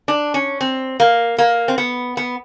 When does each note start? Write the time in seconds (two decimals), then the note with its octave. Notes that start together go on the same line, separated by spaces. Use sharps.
0.08 D4
0.34 C#4
0.61 C4
1.00 A#3
1.38 A#3
1.68 C4
1.78 B3
2.17 B3